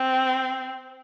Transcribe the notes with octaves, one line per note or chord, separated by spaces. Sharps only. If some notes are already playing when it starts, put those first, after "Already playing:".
Already playing: C4